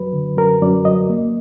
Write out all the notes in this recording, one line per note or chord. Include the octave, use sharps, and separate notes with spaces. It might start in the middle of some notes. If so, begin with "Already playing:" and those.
Already playing: F#2 F#3 B4
D3
F#2 A#4
F#2 D5
F#3 D#5
A#3